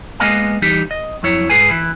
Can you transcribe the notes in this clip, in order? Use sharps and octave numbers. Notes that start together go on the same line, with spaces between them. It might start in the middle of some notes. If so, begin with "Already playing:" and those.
G#3 A#3 B3 D#5 F5 G#5
E3 G3 D#4 G4
D#5
F2 F#3 E4 C#5
G#2 G#4 B4 G#5
E3 E4